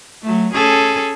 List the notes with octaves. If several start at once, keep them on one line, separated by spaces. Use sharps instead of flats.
F#3 A3
C#4 G#4 A4